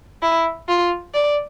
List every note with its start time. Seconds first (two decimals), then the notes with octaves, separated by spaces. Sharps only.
0.22 E4
0.68 F4
1.14 D5